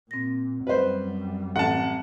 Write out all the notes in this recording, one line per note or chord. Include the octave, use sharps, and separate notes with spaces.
A#2 C4 A#6
F#2 G3 B4 C5
A1 C4 F#5 A5